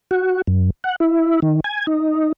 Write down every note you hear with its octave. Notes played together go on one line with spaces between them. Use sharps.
F#4
F#2
F#5
E4
D#3
G#5
D#4